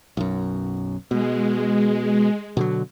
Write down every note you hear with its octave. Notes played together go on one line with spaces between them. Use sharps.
B1 F#2
B2 G#3
B2 D3 F#3